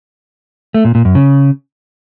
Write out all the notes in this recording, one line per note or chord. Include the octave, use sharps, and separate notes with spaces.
A3
A#2
A#2
F#2
C#3